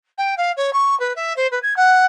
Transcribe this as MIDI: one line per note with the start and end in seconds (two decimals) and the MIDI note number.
0.18 0.34 79
0.37 0.52 77
0.56 0.73 73
0.73 0.98 85
0.99 1.13 71
1.16 1.33 76
1.36 1.47 72
1.51 1.59 71
1.62 1.74 92
1.76 2.05 78